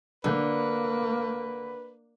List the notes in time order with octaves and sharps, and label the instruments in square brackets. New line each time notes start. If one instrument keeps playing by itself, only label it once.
[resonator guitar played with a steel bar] D3 [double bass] A#3 [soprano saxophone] B4